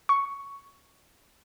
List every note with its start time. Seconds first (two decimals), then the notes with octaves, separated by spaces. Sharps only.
0.09 C#6